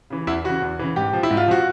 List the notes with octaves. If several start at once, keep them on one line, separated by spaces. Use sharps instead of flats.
C#3 E3
E2 E4
C#3 E3 F#4
E2
C#3 E3
G#2 G4
F3
E4
G#2
F4
F3 F#4